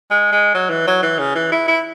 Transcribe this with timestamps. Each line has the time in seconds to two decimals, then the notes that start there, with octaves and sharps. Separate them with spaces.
0.10 G#3
0.32 G#3
0.54 F#3
0.69 E3
0.87 F#3
1.02 E3
1.19 C#3
1.35 E3
1.52 E4
1.68 E4